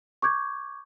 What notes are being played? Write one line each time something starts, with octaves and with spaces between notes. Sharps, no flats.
C#6 D6 G6 G#6